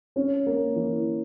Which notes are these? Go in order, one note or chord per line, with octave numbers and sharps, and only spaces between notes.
C#4
A#3
E3